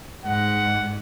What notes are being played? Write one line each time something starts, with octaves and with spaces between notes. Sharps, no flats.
G#2 F#5